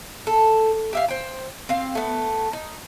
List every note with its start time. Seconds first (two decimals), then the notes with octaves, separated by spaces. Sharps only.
0.27 A4
0.93 G4 E5 F5
1.08 C5 G5
1.69 C4 F5
1.95 A3 B3
2.53 D#4